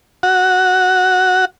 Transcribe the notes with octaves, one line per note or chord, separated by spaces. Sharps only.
F#4 F#5